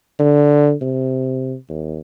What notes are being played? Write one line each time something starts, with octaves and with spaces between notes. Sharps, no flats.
D3
C3
D#2